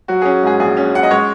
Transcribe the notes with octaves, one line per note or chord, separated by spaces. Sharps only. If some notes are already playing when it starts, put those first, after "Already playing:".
F#3 F#4
C#4 G#4
G#2 G#4
A#1 G#4
C#4
C#4 F#5
D#5
G#3 C#5